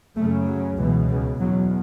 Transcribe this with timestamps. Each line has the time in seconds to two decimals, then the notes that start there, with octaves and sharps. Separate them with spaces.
0.16 F#2 C#3 A3
0.47 F#3
0.77 C#2 B2 E3
1.08 C#3
1.40 E2 B2 F#3